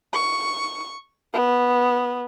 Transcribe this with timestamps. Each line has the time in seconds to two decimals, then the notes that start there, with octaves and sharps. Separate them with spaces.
0.13 C#6
1.33 B3